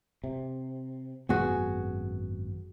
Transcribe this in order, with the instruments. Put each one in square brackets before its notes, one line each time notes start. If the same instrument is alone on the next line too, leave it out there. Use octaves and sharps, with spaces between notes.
[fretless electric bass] C3
[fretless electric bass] G#1 F#2 B3 [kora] F#4 G#4